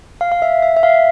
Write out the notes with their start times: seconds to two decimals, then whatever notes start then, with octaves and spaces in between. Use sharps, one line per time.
0.21 F5
0.32 F5
0.42 E5
0.62 E5
0.77 E5
0.83 F5